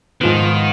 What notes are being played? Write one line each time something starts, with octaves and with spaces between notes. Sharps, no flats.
G#2 D#3 F3 B3